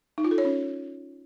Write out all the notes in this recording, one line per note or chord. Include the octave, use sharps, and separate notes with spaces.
D#4
F4
A4
C#5
C#4